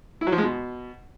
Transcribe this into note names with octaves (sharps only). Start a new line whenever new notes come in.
E4
F#3
F3
G#3
B2